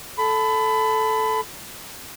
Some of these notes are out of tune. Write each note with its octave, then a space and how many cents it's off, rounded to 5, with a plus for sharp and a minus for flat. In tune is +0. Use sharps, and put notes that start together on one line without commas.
A4 -10 B5 +25